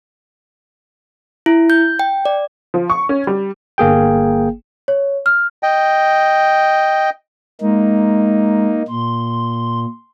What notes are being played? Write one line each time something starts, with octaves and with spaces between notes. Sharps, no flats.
E4
G6
G5
D5
F3
C#6
C#4
G3
G1 A#3 G#4 G5
C#5
F6
D#5 G5
G#3 A#3 D#4
A#2 C6